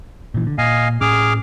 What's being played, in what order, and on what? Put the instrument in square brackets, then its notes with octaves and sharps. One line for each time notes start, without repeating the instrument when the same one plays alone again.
[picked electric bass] A#2 E3
D3
[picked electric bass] A#2 [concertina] D#5 F5 G#5
[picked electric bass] A2 C#4 [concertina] G#4 D6 F6